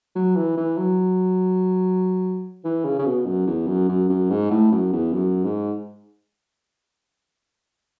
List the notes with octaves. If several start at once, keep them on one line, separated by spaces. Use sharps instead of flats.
F#3
E3
E3
F#3
E3
C#3
C#3
B2
F#2
E2
F#2
F#2
F#2
G#2
A2
F#2
E2
F#2
G#2